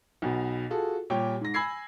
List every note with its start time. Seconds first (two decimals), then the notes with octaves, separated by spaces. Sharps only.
0.22 B1 B2
0.70 F4 F#4 G#4 A4
1.10 A#2 G3 G4 C#5 G5
1.41 G#2 A#6
1.54 G#5 B5 E6 G#6 C7